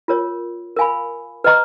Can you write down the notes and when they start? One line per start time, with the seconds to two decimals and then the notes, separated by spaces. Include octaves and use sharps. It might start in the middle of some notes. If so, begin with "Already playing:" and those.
0.08 F4 A#4 C#5
0.76 A#4 F5 G#5 B5
1.44 B4 D#5 A#5 C#6